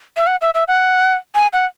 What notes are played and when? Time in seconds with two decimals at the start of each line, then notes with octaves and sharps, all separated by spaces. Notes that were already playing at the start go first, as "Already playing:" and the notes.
0.17 E5
0.27 F#5
0.41 E5
0.54 E5
0.68 F#5
1.35 G#5
1.53 F#5